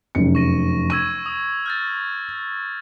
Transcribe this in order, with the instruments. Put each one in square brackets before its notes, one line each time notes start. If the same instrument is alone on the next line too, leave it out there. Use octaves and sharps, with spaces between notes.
[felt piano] F1 F#2 C#7
[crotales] C#6 A#6 D#7
[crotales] C#6 E6 G#6 [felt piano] D#7
[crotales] D#6
F6 G6 A6